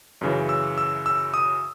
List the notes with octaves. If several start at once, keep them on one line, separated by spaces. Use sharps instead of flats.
F#2 C#3 E3
E6
E6
E6
D#6